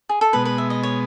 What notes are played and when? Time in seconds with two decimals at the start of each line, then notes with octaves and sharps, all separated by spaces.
0.09 G#4
0.21 A4
0.33 B2 G#3 B3 B4
0.45 B4
0.58 E5
0.70 D#5
0.83 C#5